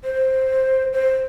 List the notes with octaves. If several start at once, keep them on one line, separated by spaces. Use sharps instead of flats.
C5
C5